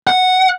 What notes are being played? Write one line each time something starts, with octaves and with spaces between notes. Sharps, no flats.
F#5